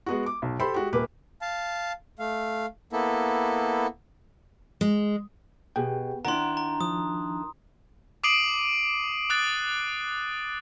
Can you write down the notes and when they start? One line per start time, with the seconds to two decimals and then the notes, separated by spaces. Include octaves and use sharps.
0.06 G#3 B3 F#4
0.26 D6
0.42 B1
0.60 G4 A4 C5 B5 C6
0.74 G#3 F#4 G4
0.93 D#1 A#3 B4 D6
1.41 F5 A5
2.19 A3 F5
2.93 A#3 B3 E4 A4
4.81 G#3
5.76 B2 G4 G#4 G5
6.25 D#3 D4 E4 F#5 A#5 C6
6.57 A#5
6.81 F3 D#6
8.24 D6 D#6 C7 D7 D#7 F#7
9.30 D#6 F#6 A6